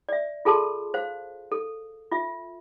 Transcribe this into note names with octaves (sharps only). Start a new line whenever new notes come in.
D5 E5
F4 G#4 A4 A5 C6
C5 F5
A4
F4 E5